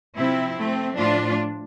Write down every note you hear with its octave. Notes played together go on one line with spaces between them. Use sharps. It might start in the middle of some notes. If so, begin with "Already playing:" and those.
C3 F3 C4 E4
A3 C4
A2 F3 D4 F4